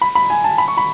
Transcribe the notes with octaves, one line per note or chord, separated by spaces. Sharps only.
B5
B5
G#5
A5
B5
C#6
B5